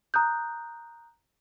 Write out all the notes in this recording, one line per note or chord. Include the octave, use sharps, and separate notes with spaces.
A#5 D#6 F#6 G6